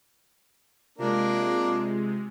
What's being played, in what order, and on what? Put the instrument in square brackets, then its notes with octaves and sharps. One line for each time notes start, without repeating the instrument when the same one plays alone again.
[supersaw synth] C3 G#3 [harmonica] A#3 D4 A#4 [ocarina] F4